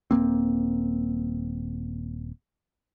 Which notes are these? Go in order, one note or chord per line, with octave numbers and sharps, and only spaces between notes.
D#1 F2 A#3 C4